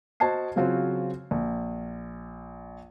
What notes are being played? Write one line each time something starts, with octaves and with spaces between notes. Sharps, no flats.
F#4 C5 D#5 A5 G#6 C7
C#3 F#3 C4 F4 F#4 C5
A#1